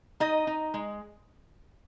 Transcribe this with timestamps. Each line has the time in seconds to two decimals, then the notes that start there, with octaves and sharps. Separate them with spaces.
0.20 D#4 D#5
0.47 D#4
0.74 G#3